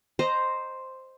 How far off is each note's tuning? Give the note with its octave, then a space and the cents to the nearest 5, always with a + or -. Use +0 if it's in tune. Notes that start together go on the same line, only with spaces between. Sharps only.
C5 +0 D#5 -10 A#5 +0